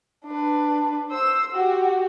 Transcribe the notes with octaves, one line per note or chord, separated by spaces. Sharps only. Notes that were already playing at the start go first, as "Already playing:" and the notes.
D4 B4
C5 E6
F#4 G4